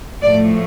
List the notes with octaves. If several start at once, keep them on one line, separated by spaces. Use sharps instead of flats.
A2 F3 A3 D5